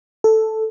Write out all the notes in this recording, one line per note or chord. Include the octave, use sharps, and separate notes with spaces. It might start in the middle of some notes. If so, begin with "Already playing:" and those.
A4